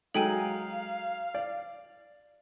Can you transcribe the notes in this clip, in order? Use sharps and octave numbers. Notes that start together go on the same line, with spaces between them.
F#3 G#3 D#4 A4 F5 G5 G#5
D5